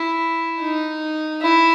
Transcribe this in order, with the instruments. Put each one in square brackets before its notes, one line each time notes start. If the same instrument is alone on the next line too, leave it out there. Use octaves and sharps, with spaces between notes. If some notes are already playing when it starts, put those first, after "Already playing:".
Already playing: [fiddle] E4
D#4
E4